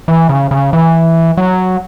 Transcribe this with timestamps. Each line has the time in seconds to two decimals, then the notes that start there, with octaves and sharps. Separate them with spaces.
0.08 E3
0.29 C#3
0.51 C#3
0.73 E3
1.37 F#3